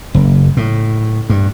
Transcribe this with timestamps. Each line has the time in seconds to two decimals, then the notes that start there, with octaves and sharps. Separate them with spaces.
0.14 F#1
0.57 A2
1.30 G2